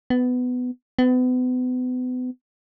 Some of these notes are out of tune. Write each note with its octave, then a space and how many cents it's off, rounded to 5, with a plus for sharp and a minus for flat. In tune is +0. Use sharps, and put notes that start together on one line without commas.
B3 +15
B3 +35